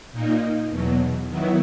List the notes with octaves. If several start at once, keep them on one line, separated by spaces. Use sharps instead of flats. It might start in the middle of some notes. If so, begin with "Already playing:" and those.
A#2 A#3 D#4
E2 B2 F#3
D#3 F#3 B3 E4